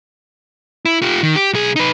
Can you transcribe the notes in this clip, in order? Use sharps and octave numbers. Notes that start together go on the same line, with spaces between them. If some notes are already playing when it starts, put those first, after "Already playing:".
E4
F4 G4
D#3
G4
B1 G#4
D#4 B4